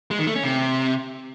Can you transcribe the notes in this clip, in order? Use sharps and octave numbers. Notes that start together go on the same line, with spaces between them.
G#3
D#3
A3
C#4
C3